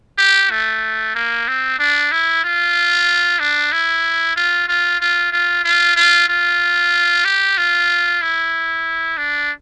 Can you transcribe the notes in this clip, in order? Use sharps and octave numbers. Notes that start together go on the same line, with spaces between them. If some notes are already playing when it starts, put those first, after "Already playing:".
G4
A3
A#3
C4
D4
E4
F4
D4
E4
F4
F4
F4
F4
F4
F4
F4
G4
F4
E4
D4